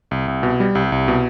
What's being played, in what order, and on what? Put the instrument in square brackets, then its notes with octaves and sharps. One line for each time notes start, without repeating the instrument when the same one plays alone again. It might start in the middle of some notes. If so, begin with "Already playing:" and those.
[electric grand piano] C2
C2
B2
G3
C2
C2
B2